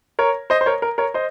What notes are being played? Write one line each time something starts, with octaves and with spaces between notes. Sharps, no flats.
A#4 C#5
C5 D#5
C5
A#4 C#5
A#4
A#4 C#5
C5 D#5